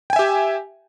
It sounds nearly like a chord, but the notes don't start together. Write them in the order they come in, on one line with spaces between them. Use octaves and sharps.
G5 G#5 E5 G4